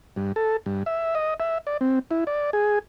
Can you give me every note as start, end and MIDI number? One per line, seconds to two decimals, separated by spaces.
0.16 0.32 43
0.36 0.57 69
0.66 0.83 43
0.86 1.15 76
1.15 1.34 75
1.40 1.58 76
1.67 1.77 74
1.81 1.99 60
2.11 2.24 64
2.27 2.50 74
2.53 2.79 68